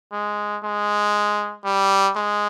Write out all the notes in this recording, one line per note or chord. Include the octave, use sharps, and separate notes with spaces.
G#3
G#3
G3
G#3